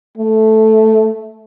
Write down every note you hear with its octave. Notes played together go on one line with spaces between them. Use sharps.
A3